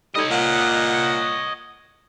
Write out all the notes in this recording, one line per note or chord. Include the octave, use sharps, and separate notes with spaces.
G3 D#4 A4 C#5 D#5
A#2 F#5